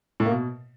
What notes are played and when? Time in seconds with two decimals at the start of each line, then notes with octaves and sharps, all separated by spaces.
0.20 A2
0.26 A#3
0.31 B2